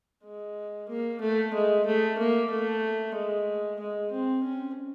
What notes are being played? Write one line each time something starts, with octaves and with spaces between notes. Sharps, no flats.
G#3
A#3
A3
G#3
A3
A#3
A3
G#3
G#3
C4
C#4